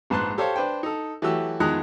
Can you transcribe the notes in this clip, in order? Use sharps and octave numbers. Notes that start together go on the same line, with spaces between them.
A#1 G#2 B4 A5 C6 F#6
G4 A4 C5 C#5 F5
D4 B4 C5 G5
D#4 A4
E3 F#3 A3 F#4 G4 E6
E2 D#3 F3 G#3 D#4 F#6